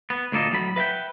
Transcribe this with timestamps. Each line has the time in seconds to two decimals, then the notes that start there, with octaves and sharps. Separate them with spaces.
0.10 B3
0.32 D2 A#2 A#3 A4 D#5
0.51 A2 F#3 B5
0.76 B4 E5 F#5 G5